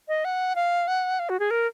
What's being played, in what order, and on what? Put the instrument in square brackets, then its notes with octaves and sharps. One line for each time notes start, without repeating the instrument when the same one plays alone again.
[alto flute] D#5
F#5
F5
F#5
F5
F#4
G#4
A#4